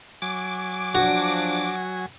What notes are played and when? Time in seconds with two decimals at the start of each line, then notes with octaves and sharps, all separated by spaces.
0.22 F#3 G#5 D6
0.95 F3 D4 F#4